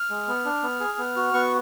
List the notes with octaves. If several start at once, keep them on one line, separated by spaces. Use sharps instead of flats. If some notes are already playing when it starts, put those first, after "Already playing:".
Already playing: F6
G#3
B3
D4
B3
G#4
B3
F#4
B3 C#6